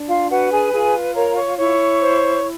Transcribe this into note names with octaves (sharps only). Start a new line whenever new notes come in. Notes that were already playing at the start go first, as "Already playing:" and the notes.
Already playing: D4
F4 F5
F#4 B4 F#5
G#4 G#5
F4 G#4 G#5
A#4 C#5 A#5
C#5 C#6
E4 C#5 C#6
C5